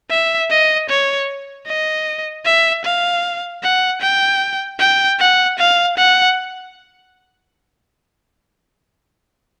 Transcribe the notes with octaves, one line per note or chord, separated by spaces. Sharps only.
E5
D#5
C#5
D#5
E5
F5
F#5
G5
G5
F#5
F5
F#5